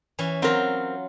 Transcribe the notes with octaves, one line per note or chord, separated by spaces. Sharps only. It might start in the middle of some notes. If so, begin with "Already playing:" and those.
E3 C#4
F#3 C4 F4 A#4